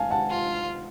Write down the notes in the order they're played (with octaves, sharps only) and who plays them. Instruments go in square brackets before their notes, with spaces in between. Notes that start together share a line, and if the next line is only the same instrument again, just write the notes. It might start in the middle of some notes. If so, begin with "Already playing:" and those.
Already playing: [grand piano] F5 G#5 A5
F#5 A5
[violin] F4